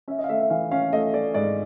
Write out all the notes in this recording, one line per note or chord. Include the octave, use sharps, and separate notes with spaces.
C#4 E5
D#5
F5
A3 E5
E5
E3 F5
C#4 F5
A3 D#5
A3 D5
G#2 D5